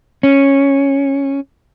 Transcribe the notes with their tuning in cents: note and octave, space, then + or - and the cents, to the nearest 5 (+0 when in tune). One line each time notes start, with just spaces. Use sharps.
C#4 -5